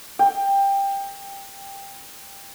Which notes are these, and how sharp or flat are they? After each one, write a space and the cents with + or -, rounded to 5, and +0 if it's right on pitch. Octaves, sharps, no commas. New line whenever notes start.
G5 +15